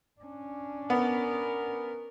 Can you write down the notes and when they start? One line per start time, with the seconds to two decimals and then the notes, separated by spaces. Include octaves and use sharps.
0.21 C#4 D4
0.90 B3 A#4